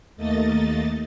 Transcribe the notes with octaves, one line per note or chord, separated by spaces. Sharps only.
D#2 A3 A#3 D#5 A6